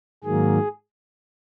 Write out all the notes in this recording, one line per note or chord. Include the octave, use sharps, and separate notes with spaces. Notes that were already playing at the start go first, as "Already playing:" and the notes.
G#2 D#3 F#3 A#3 G#4